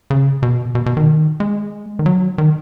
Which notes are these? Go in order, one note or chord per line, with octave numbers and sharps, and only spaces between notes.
C#3
B2
B2
B2
D#3
G#3
D#3
F#3
D#3